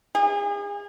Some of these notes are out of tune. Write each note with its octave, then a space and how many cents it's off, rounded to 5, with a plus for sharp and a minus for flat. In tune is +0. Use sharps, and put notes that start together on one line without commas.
G#4 -35